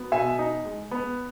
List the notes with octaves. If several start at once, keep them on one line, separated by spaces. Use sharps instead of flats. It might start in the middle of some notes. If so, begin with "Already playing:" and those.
Already playing: F#3 B3
B2 E5 G#5
D#4
G#3
B3